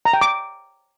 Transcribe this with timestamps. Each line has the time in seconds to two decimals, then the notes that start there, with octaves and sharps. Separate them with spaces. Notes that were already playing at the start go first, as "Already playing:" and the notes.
0.05 A#5
0.13 G5
0.21 D6